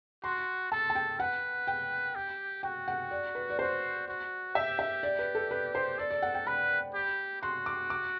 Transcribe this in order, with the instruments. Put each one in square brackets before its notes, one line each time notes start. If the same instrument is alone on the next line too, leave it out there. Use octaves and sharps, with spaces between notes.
[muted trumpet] F#4 [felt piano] C6
[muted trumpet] A4 [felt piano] A5
[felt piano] A5
G5
[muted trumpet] B4 [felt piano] F#5
[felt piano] G5
[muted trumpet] G4
[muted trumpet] F#4 [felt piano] G5
[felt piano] F#5
D5
B4
D5
[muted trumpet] F#4 [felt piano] C5
[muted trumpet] F#4
[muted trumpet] G4 [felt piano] E5
[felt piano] E5
D5
B4
A4
B4
C5
[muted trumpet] A4 [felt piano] D5
[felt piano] D5
F#5
G5
[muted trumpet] B4 [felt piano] B5
[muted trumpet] G4
[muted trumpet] F#4 [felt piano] C6
[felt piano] D6
D6